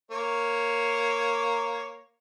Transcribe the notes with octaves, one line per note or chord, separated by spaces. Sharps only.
A#3 C#5